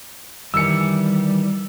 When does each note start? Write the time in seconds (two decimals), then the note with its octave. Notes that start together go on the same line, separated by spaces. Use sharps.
0.54 D#3 E3 G3 G#5 E6 C#7